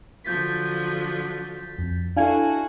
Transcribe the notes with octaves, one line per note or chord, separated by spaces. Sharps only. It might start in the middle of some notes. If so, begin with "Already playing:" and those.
D3 F3 F#3 G6 A6 B6
F2
D4 E4 F#4 A4 F5 G#5 G#6